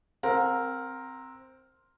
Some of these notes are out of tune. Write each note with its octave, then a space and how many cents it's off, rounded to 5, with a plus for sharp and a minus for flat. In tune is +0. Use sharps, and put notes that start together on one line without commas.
C4 +5 A#4 +0 F#5 -45